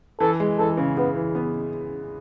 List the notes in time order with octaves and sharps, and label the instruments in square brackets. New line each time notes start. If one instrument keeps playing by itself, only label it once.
[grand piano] E3 [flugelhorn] A4
[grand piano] G#3
[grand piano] E3 [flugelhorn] A4
[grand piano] C#3
[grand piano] C#3 [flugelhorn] B3
[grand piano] E3
B3